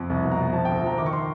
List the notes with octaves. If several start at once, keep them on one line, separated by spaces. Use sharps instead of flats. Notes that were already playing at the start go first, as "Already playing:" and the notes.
Already playing: F2
C2
B2
A#5
B2
F3 A5
D2 G5
F3 A#5
D#3 D6
C#6
C6